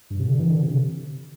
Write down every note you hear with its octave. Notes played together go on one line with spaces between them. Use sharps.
G2
C3
D3
E3
D3
C3